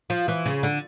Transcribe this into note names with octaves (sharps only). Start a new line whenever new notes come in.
F3
E3
C#3
D3